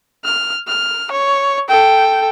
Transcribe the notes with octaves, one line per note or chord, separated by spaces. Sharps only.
F6
F6
C#5
A4 G5